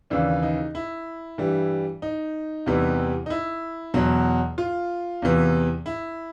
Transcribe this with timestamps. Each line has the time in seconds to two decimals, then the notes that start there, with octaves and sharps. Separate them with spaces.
0.10 D#2 C#3 E3 D4
0.43 D#4
0.75 E4
1.38 G2 E3 G3
2.02 D#4
2.66 E2 C3 E3 G3
3.26 D#4
3.30 E4
3.94 E2 B2 F#3
4.58 F4
5.22 E2 C3 E3
5.86 E4